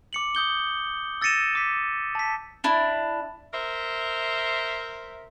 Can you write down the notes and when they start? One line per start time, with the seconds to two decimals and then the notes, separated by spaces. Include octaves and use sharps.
0.13 D6 C#7 F#7
0.35 D#6 G6 G7
1.22 E6 A6 A#6 C#7 D#7 E7
1.55 D6 B6
2.15 A5 B6
2.64 D4 E4
3.53 A#4 C5 E5